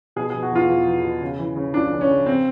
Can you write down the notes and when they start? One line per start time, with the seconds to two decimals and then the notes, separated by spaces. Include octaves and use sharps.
0.16 B2 G#4
0.30 G#4
0.34 B2
0.43 F#4
0.51 E2 F4
0.69 E2
0.86 E2
1.04 B2
1.21 C#3
1.39 E3
1.56 C#3
1.74 C#2 D4
1.92 C#3
2.01 C#4
2.10 C#3
2.26 C4